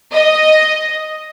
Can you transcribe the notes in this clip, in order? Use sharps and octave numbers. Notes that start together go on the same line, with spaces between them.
D#5